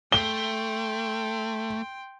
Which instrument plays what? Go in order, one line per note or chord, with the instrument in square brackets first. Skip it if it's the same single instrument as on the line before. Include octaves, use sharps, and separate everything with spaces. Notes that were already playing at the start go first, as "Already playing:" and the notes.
[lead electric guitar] A3 [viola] G5 C6 [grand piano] G7